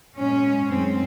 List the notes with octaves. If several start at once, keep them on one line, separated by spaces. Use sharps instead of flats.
A#2 G#3 C#4
F#2 D#3 G#3 C4